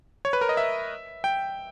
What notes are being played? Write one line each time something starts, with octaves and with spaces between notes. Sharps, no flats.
C#5
B4
A#4
D#5
E5
G5